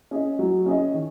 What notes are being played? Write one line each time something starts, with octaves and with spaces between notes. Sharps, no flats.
C#4 G#4 D#5
F#3
C#4 G#4 D#5
D#3